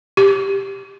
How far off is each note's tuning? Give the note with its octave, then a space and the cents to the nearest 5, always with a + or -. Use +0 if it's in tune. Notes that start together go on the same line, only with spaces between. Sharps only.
G4 +5